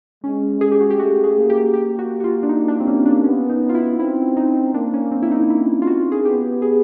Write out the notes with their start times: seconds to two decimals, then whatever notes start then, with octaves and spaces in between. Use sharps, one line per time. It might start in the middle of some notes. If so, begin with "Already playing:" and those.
0.24 G#3 C#4
0.61 G#3 G#4
0.72 G4
0.81 F#4
0.90 G4
0.99 A3 F#4
1.24 G#4
1.36 A#3
1.50 G4
1.74 G4
1.99 F#4
2.20 F#4
2.24 F4
2.43 D4
2.49 D#4
2.68 D4
2.80 C4
2.87 C#4
3.06 D4
3.24 B3 C#4
3.49 D#4
3.69 F4
3.75 E4
3.99 C4 E4
4.37 D#4
4.74 A#3 D4
4.94 C#4
5.11 C4
5.22 E4
5.31 D#4
5.50 E4
5.82 F4
5.87 F#4
6.12 G#4
6.25 B3 G4
6.62 G#4